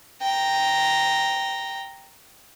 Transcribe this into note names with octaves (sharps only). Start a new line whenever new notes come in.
G5 A#5